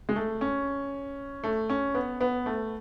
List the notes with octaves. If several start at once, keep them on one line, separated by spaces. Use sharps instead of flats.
G#3
A3
C#4
A3
C#4
B3
B3
A3